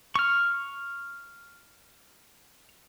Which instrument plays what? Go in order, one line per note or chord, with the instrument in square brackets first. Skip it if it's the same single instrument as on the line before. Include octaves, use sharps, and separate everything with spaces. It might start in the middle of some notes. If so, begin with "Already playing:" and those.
[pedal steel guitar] C#6 F6